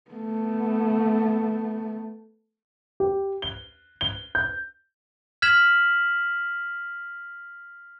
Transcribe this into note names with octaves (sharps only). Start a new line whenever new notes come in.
A3 B3
G4
G7
G7
G6
F6 G#6 B6 E7 F#7